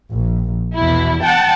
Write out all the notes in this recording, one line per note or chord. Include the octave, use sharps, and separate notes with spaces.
A#1
E2 B2 E4
F#5 G5 A5